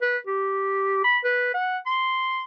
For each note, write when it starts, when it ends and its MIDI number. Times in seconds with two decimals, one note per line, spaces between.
0.02 0.17 71
0.27 1.02 67
1.04 1.18 83
1.24 1.49 71
1.54 1.77 78
1.86 2.44 84